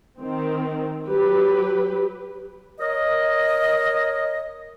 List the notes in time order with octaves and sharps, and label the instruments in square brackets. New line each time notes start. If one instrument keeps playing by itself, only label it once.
[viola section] D#3 C4
F#3 G4 B4
[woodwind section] A#4 C#5 D#5